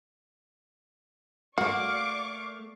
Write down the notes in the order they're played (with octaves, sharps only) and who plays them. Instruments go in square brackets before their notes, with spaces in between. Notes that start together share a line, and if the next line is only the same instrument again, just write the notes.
[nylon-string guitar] A3 A#3 [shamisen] F#4 [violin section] D5 C#6 D6 [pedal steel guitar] F5